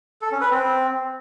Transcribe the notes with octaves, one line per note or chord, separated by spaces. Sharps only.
A4
C#4
B4
C4